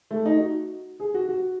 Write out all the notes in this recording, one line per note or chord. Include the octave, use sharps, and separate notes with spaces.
A3
D#4
F#4
G#4
F#4
F#4